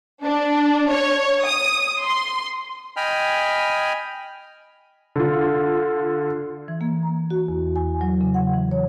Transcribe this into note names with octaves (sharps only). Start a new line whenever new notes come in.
D4
C#5
D#6
C6
D#5 G5 G#5 B5 F6
D3 F4
E3
A#3
A#5
F#4
E2
G#5
F#3
C#3
F#5
E3
C#5